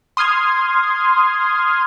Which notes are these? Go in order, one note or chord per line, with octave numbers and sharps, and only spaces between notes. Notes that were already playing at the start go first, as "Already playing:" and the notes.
C6 D#6 F6 G#6